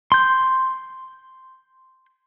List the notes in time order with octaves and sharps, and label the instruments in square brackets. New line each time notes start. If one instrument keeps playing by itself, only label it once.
[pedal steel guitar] C6 G6